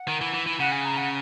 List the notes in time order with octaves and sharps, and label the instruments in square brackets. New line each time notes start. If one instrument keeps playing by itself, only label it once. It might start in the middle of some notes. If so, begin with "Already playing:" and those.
Already playing: [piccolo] F#5
[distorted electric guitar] D#3
E3
E3
E3
[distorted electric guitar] C#3 [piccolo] F#5
[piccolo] G#5
A#5
F#5